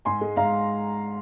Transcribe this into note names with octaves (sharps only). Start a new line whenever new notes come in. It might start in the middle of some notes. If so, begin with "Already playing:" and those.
G#2 G#5 C6
G#3
G#2 F5 A#5